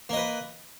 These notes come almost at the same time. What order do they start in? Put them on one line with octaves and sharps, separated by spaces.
A#3 D#5 B4